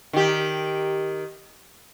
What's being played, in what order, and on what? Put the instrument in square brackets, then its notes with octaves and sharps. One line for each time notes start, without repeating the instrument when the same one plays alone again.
[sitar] D#3 G4